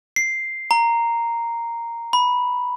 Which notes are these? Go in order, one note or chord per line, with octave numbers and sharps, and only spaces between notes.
C7
A#5
B5